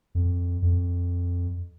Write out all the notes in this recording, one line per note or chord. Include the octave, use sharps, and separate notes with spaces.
F2
F2